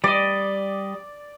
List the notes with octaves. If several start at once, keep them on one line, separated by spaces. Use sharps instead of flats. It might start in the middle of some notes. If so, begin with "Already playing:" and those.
G3 D5 D#5